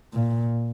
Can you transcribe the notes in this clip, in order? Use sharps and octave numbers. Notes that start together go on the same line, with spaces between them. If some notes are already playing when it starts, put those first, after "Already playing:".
A#2